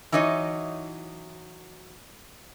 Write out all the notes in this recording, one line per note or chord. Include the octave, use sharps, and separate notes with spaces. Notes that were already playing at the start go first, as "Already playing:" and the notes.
E3 F#3 D#4 C#5 D#5